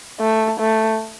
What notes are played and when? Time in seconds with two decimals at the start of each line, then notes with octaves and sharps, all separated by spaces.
0.21 A3
0.60 A3